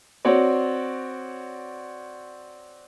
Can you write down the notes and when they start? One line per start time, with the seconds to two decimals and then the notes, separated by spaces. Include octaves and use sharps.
0.25 C4 F#4 C#5 D5